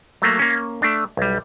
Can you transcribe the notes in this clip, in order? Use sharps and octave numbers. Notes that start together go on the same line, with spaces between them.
F#3 A3 A#3
A#3 C#4
A3 D4
B1 G3